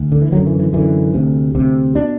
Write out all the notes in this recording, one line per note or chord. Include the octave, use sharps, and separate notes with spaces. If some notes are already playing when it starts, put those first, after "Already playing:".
Already playing: D2
D3
E3
F#2 D3 F#3
E3
E3
F#2 D3 E3
D2 C3
D2 C3
B2 D4